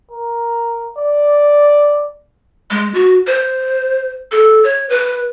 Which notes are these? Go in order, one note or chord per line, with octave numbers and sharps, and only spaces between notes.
A#4
D5
G#3
F#4
C5
A4
C#5
B4